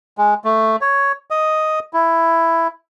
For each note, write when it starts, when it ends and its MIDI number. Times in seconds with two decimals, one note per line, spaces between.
0.18 0.34 56
0.44 0.76 57
0.81 1.12 73
1.31 1.79 75
1.93 2.67 64